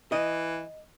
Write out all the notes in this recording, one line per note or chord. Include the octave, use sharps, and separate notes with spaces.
E3 D#5